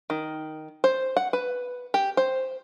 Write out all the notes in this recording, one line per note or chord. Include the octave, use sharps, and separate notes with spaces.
D#3
C5
F#5
B4
G4
C5